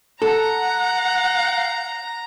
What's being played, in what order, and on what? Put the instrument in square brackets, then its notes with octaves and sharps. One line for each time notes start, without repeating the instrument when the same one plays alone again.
[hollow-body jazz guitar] A4 [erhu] F#5 [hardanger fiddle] A#5